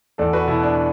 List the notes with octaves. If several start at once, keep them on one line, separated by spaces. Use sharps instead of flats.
E2 A4 D5
F#4 B4
B2 E4
D4